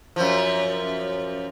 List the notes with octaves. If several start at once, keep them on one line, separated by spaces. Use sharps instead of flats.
F#2 F3